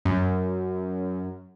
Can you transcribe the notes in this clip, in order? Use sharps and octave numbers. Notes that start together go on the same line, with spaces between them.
F#2